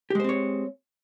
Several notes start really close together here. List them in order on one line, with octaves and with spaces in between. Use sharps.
G4 G#3 C5 C4 C#5